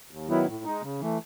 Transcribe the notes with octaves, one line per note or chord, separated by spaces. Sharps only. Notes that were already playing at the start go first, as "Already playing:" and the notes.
D#2
D#3 F#3 B3 E4
A2
G#3 D#4
C#3
E3 A3